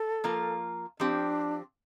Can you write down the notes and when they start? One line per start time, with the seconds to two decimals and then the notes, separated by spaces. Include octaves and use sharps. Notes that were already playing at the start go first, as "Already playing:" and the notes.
Already playing: A4
0.24 F3 A#3 F4 A#4
1.00 F3 C4 D4 G4